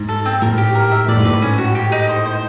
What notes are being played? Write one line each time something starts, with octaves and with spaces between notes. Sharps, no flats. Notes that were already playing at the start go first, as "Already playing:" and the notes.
Already playing: G#2
A4
C4
A2 A#4
G4
A#4
E5
A2 D5
G#2
A2 B4
C#4
F#4
G4
D#4
C5
C5